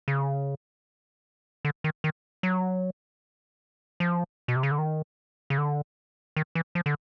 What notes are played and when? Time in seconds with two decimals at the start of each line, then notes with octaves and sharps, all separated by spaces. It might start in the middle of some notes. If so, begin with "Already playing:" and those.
0.08 C#3
1.65 D3
1.84 D#3
2.04 D#3
2.43 F#3
4.00 F3
4.48 B2
4.56 C3
4.63 C#3
4.71 D3
4.78 D#3
5.50 C#3
5.58 D3
6.36 D#3
6.55 E3
6.75 F3
6.86 D3